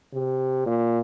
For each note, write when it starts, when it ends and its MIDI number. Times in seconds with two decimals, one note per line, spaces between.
0.13 0.62 48
0.66 0.99 46